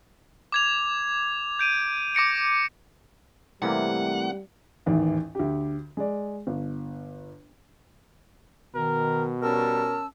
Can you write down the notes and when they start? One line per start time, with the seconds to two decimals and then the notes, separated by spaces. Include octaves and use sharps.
0.52 D6 G#6 F7
1.59 G6 D7 D#7
2.15 D6 A#6 C#7 D7
3.62 C3 E3 G3 A3 A#3 C4 E4 F#5
4.86 A1 D#2 G#2 E3
5.35 D2 G4
5.97 G#3 D5
6.47 G1
8.75 B2 D#3 A#4
9.42 G3 C#4 A#4 A5 E6